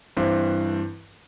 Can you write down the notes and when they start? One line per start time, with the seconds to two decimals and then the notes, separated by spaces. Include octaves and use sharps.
0.17 G2 E3 C4